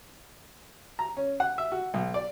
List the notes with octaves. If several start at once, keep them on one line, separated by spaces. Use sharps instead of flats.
A#5
C#4
F#5
E5
F#4
B1
D5